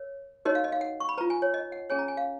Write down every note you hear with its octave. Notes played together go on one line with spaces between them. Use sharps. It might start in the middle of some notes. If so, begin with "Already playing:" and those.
Already playing: A#4 C#5
D#4 F#4 A#4 C#5 D#5
F5
D#5
F5
F#5
C#6
B5
F4 B4 A#5
G#5
C#5
D#5
F#5
C#4 G#4 C#5 G#5
A#5
G#5
F5